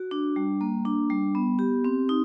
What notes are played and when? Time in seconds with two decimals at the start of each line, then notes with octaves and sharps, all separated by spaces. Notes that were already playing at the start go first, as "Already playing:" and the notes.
Already playing: F#4
0.11 D4
0.36 G3
0.61 A#3
0.85 D4
1.10 G3
1.35 B3
1.59 G4
1.84 C4
2.09 D#4